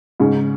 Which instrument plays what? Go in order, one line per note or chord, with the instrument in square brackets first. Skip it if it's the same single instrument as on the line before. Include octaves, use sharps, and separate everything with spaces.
[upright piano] G#2 C#3